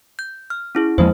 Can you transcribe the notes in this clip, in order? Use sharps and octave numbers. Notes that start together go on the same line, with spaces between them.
G6
F6
C#4 E4 G#4
E2 F3 G#3 A#3 C5